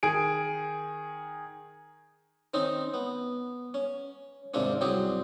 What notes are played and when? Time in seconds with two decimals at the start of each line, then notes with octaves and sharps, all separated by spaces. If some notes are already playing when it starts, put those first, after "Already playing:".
0.03 D#3 G#4 D7
2.54 D#3 C4 C#4 D#4
2.94 B3
3.74 C#4
4.54 D#2 G#2 C3 A#3 C4 D4
4.81 C2 F#3 C4 G4 G#4